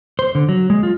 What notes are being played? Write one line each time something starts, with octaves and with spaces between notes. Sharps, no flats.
C5
D3
F#3
G#3
F4